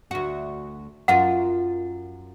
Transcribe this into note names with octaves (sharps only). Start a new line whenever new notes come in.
D2 F#4
F#2 F4 A#4 F#5